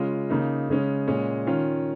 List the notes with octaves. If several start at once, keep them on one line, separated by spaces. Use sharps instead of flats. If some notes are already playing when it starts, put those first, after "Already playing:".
Already playing: C#3 G#3 C#4 F4
C#3 A#3 D#4
C#3 G#3 C#4
A#2 G#3 C#4
D#3 C#4 F4